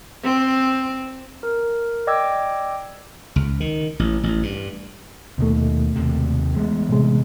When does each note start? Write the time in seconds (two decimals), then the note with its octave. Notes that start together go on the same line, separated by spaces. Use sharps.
0.23 C4
1.43 A#4
2.07 D5 D#5 G5 D6 E6 G#6
3.36 C#2
3.60 D#3
3.99 A1
4.23 A1
4.43 G2
5.38 D#2 B2 D#3 A3
5.96 D#2 C3
6.56 E3 G#3 A3 B3
6.89 A2 C3 G#3